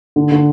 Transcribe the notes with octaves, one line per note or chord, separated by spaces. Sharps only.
D3
D3